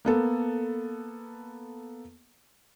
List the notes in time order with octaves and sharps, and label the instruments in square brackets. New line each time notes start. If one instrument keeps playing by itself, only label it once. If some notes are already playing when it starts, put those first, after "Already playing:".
[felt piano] A#3 B3 A4